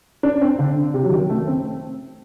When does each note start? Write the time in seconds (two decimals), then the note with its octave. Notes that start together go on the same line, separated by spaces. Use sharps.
0.23 D4
0.41 C4
0.59 D3
0.94 C3
1.04 F#3
1.12 D#3
1.30 A3
1.47 C4